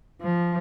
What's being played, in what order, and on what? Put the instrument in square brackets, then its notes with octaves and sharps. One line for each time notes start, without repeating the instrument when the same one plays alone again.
[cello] F3